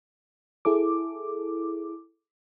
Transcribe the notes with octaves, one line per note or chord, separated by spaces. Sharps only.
E4 G#4 A4 D6